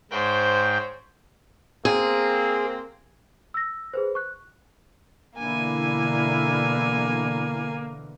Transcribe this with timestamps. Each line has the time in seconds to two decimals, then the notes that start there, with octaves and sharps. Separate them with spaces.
0.11 G#2 C5 C#5 G5
1.85 A#3 C4 G#4
3.54 E6 A#6
3.94 G#4 B4 C5
4.15 C#6 F#6
5.38 B2 D3 E3 A#3 D4 E4 G#5